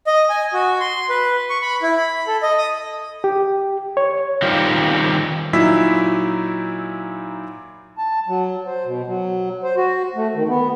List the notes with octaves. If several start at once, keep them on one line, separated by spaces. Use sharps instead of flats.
D#5
G#5
F#4
C6
B4
C#6
B5
E4
B5
A4
D#5
D#6
G4
C#5
D#3 G3 C4 F4
A#2 F#3 D#4 E4 E6 B6
A5
F#3
C5
B2
F#3
C5
F#4
A3
D#3
B3